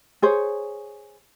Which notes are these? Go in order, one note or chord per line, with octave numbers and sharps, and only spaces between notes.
G#4 C5 C#5